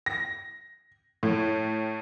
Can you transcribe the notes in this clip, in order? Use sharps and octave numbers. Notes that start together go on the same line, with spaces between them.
A#6
A2